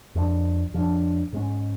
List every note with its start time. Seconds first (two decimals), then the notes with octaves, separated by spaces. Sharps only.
0.15 F2 F3 G#3 D4
0.74 F2 F3 G#3 D4
1.33 G#2 G#3 C#4